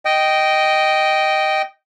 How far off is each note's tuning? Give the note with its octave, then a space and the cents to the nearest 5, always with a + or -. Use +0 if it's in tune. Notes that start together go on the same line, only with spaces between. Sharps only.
D#5 +0 G5 -10